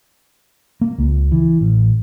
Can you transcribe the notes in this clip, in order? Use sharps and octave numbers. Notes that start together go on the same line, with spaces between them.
A#3
C#2
E3
A1